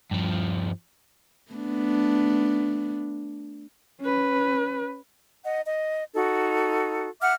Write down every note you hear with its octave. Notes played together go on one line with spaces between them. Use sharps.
G2 F3
A3 B3 D4
C#4 B4
D#5 F#5
D#5
D#4 F#4 A4
E5 F#5 D6 F6